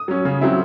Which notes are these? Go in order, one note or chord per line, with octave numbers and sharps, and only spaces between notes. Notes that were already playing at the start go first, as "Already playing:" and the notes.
Already playing: D#6
F#3 C#4
C#3
F#3 C4 E4